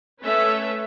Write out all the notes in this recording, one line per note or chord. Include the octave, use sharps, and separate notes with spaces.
A3 C#4 A4 B4 C#5 E5